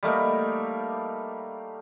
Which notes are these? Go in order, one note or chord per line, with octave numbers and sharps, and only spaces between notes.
G3 A3 A#3 D#4